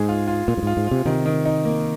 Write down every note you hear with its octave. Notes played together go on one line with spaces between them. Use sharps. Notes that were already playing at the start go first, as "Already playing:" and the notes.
Already playing: G#2 G#3 G#4
F4
F4
A#2 F4
G2
G#2 F4
G#2
C3 F4
C3 D#3
D#3
D#4
A#3